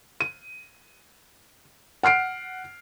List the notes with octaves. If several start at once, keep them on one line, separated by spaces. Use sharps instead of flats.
D#7
F#5 F6 C7 D7